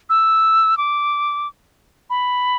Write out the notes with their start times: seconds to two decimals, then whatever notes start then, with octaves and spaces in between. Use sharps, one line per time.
0.09 E6
0.77 D6
2.10 B5